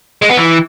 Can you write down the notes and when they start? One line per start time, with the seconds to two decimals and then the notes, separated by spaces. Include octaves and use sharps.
0.22 G#3
0.30 B3
0.37 E3